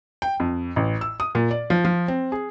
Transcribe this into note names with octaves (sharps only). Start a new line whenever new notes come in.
G5
F2
A1
E6
D#6
A#2
D5
F3
F3
C4
G#4